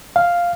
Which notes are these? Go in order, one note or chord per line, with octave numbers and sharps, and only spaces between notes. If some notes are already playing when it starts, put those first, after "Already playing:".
F5